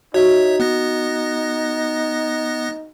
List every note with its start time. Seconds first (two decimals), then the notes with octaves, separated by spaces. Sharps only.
0.14 D#4 F#4 C#5 E5
0.60 B3 F#6 A#6